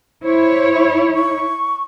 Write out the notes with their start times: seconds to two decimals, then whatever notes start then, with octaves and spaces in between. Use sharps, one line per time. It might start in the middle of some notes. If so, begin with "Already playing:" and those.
0.23 E4 C5 C#5
1.15 C#6